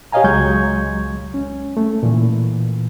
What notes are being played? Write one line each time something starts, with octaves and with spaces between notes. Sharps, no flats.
G4 C#5 D#5 F5 G#5 A#5
C#2 F#3 G#3 C#6 G6 G#6
C#4
A3
A#2 E3